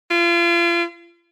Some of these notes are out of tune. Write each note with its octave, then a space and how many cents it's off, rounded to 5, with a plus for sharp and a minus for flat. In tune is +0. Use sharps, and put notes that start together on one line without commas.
F4 -35